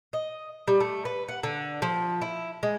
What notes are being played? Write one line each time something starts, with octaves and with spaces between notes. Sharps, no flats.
D#5
G3
A3
B4
F#5
D3
F3
E4
G#3